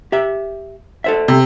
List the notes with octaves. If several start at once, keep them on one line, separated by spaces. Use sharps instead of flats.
G4 E5
A4 C5 E5
C3